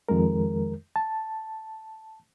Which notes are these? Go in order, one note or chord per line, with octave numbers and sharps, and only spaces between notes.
F2 D#3 G#3 A#4
A5